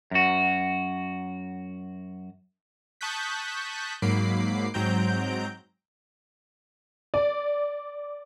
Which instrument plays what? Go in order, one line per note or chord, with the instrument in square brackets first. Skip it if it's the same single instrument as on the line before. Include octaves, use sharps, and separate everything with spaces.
[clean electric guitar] F#2 F#4
[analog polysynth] A5 C#6 D#6 F#6 G6 B6
G#2 F#3 A#3 B5 D6 C7
G#2 F#3 C4 A#5 G6 D7
[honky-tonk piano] D5